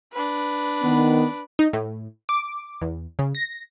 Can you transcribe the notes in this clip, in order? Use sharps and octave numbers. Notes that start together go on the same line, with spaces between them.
D4 B4
D#3 B3
D#4
A2
D6
E2
C#3
A#6